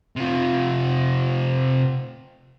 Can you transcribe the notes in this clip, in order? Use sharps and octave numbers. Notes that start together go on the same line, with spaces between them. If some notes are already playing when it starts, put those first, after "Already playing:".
C3 F4